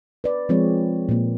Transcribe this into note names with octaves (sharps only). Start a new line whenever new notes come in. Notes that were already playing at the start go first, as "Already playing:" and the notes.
B4 D5
F3 G#3 C4 G#4 C#5
A#2 A#3